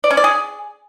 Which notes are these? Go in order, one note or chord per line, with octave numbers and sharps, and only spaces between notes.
D5
C#4
D5
G#4